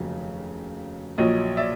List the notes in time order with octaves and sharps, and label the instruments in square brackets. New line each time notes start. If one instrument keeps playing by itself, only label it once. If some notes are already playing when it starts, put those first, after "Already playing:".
Already playing: [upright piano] F1 D#2 C#3 F#3
A#1 A#2 F#3 C#5 D#5
D5 E5